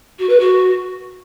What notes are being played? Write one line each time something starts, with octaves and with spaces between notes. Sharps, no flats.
F#4
B4
F#4